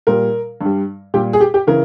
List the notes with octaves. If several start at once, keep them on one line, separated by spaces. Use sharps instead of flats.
A#2 G3 A#4
G2 G3
A#2 G3 G4
G#4
G4
G4
C#3 E3 A#4